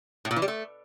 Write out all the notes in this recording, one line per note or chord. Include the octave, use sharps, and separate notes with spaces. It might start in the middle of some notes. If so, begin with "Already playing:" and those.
A2
A#2
E3
G3
A3